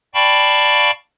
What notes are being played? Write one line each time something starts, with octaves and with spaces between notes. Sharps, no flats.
D5 F5 G5 A5 B5 C#6